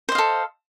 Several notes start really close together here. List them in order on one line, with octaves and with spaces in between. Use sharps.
C5 D#5 F5 A4